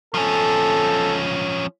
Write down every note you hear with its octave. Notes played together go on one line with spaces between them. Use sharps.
F3 C#4 A4